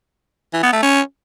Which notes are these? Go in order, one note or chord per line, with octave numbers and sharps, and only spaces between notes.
E3
B3
A3
C#4